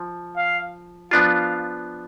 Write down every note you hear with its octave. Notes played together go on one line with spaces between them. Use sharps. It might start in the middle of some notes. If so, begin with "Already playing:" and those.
Already playing: F3
F5
F3 B3 D4 F4 F5